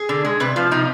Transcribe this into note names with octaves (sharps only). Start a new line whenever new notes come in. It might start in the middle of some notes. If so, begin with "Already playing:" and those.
Already playing: G#4
D3
G#3
C3 B4
F3 F4
C3 D#4